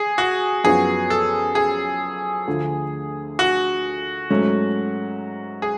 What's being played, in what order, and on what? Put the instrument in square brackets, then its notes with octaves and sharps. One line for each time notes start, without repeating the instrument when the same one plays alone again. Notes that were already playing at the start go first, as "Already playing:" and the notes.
Already playing: [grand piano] G#4
F#4
[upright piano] F#2 F3 B3 F#4 [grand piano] G#4
[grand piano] A4
G#4
[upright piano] D2 D3 F3 A3
[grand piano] F#4
[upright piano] G#2 F#3 A3 C#4
[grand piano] G#4